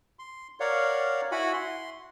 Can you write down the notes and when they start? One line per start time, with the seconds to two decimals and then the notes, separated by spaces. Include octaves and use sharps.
0.19 C6
0.60 A#4 C#5 D5 F5 F#5
1.32 E4 F#4 F#5 G#5 B5
1.53 C6